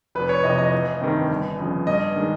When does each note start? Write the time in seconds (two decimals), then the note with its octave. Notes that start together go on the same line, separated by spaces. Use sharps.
0.15 F1 B4
0.29 C#5
0.43 F2 C3 E3 D#5
0.58 D#5
0.73 A1
1.01 G2 D#3 G3 C4
1.31 G1
1.59 F2 C#3
1.87 G2 D#5
2.16 D#3 G#3